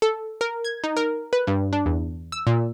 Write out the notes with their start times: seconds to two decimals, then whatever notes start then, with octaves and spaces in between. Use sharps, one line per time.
0.02 A4
0.41 A#4
0.64 G#6
0.84 D#4
0.97 A#4
1.33 B4
1.47 G2
1.73 D4
1.86 E2
2.32 E6
2.47 A#2